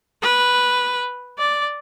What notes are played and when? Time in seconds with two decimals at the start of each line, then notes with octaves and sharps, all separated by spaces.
0.23 B4
1.39 D5